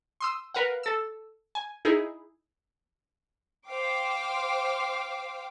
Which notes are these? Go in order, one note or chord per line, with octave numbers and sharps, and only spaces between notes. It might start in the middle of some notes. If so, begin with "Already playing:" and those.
C6 D#6 E6
A#4 B4 F5 F#5
A4 E6
G#5
D#4 E4 G#4
C5 F5 G5 D6